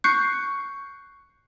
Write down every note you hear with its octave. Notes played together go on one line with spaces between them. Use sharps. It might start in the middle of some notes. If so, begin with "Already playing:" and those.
C#6 F#6 G6 C7 C#7